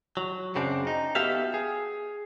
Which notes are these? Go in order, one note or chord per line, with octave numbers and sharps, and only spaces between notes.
F#3
F#2 C#3 C4 D4
D#4
B3 F#4 G4 A4 E5 F5
G#4